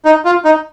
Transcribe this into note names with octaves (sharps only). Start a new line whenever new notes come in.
D#4
F4
D#4